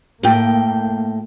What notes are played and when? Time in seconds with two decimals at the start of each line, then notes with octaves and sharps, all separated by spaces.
0.23 A2 A#3 G5